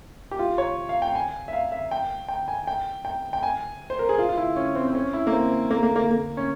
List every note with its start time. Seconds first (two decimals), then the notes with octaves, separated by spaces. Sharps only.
0.31 G4
0.39 F4
0.58 C#5
0.89 F5
1.02 G5
1.15 G#5
1.48 E5
1.53 F5
1.72 E5
1.91 G5
2.29 G5
2.48 G#5
2.67 G5
3.05 G5
3.33 G5
3.43 G#5
3.90 C5
3.99 A#4
4.09 G#4
4.19 F4
4.29 F4
4.37 E4
4.56 C#4
4.75 C4
4.87 C4
4.95 C#4
5.13 E4
5.27 A#3
5.33 C4
5.71 A#3
5.83 A#3
5.96 A#3
6.11 A#3
6.37 C#4